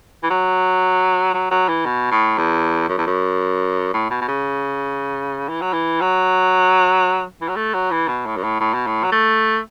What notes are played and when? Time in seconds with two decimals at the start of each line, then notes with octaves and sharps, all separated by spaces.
0.23 E3
0.30 F#3
1.34 F#3
1.51 F#3
1.68 E3
1.85 B2
2.11 A2
2.38 E2
2.89 F#2
2.98 E2
3.07 F#2
3.93 A2
4.10 B2
4.21 B2
4.28 C#3
5.49 E3
5.61 F#3
5.73 E3
6.01 F#3
7.41 E3
7.49 F#3
7.56 A3
7.74 F#3
7.91 E3
8.08 B2
8.26 A2
8.37 F#2
8.43 A2
8.60 A2
8.74 B2
8.87 A2
9.04 F#3
9.12 A3